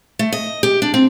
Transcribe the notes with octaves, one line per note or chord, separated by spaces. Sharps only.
A3
D#5
G4
D4
C4